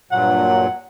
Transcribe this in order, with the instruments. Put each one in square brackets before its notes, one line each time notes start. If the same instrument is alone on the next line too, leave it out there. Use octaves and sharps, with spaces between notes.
[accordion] G2 A#2 F#3 [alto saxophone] F#5